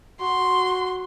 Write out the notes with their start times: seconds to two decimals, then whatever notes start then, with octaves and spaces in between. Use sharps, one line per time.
0.21 F#4 C6